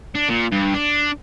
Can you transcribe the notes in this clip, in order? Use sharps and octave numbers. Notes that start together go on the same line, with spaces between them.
D4
A#2
G2
D4